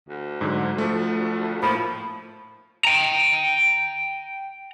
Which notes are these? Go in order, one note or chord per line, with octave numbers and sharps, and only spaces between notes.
D2
G#2 D3 F#3
F3 A3
A2 F3 A#3 B5
G5 A#5